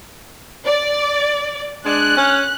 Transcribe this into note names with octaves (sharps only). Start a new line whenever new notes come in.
D5
G#3 D4 F#6
C#4